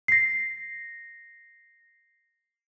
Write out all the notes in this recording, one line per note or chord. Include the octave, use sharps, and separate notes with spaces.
A#6 C7